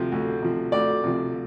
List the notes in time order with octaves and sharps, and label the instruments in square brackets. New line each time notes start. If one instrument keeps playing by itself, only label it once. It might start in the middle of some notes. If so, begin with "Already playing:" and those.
Already playing: [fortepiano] D2 C3 F3
D2
C3 F3
D2 D5
C3 F3